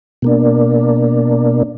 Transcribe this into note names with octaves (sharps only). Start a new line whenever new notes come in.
B2 A#3 D4